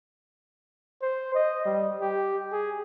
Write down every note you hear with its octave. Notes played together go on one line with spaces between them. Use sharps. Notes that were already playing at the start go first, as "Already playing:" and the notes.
C5
D#5
G3
G4
G#4